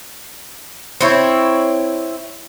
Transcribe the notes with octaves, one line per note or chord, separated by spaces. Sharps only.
C4 E4 C#5